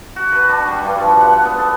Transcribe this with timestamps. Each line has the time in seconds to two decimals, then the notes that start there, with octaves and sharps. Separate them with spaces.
0.16 F#4
0.32 B4
0.49 D4
0.68 G3
0.85 G2
1.00 F3
1.21 F#5
1.33 F#5
1.45 B3
1.58 A4